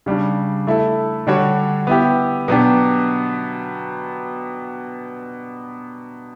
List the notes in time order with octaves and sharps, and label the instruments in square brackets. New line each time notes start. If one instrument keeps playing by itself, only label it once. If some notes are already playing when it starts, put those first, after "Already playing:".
[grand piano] C#3 G3 D4
A3 E4 A4
D3 G3 D4 F#4 C#5
B3 E4 G4
B2 F#3 B3 D4 G4